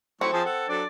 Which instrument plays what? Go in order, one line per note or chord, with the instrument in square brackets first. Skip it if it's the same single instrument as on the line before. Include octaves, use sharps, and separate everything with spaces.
[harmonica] F#3 A3 E4 [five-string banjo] C4 [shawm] C#6
[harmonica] F3 G#4 C5 [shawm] A5
[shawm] A4 [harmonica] F#5
[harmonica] F#3 D4 A4 [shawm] D5